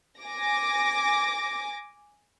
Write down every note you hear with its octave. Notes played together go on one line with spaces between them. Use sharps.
G#5 D6 A#6